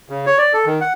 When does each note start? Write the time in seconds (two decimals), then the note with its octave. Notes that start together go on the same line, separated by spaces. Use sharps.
0.09 C#3
0.27 C#5
0.38 D5
0.53 A4
0.66 D#3
0.81 F#5